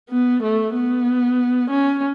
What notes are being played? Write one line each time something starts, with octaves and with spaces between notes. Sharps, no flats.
B3
A3
B3
C#4